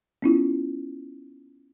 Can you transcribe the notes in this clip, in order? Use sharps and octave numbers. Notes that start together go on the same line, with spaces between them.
B3 C#4 E4 F4